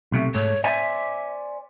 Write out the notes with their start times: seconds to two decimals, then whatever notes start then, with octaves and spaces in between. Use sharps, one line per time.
0.12 B1 C3 A3
0.34 G#2 A3 C#5
0.64 C5 D5 E5 G#5